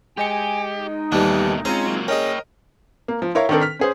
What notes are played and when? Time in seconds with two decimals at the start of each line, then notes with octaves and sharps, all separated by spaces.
0.17 G#3 G4 D#5 G#5 C#7
0.75 D#4
1.12 D#2 B2 E3 G3 A3 D4
1.65 G#3 C4 C#4 F4 C5 A#5
1.87 F#3 A#3
2.08 C#4 G#4 A#4 C#5 D#5 G5
3.08 A#3
3.22 F3
3.35 E4 A#4 C#5 F5 A#5 C#6
3.49 D#3 C4 D4 A4 A#4
3.61 F6 B6
3.79 C#4 G#4 C5